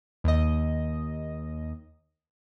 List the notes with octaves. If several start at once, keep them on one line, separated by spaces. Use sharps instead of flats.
D#2 D#5